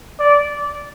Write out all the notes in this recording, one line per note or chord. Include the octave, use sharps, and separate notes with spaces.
D5